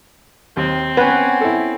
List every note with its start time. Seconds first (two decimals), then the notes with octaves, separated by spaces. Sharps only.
0.57 D#2 C4
0.97 B3 C#4 B4
1.41 E4 A4